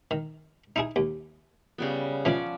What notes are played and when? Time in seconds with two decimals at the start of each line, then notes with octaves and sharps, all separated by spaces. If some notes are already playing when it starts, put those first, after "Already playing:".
0.11 D#3
0.76 D#4 E4 G#4
0.96 D#2
1.78 C#3 G3 B3
2.25 C#3 E3 F3 C#4 D5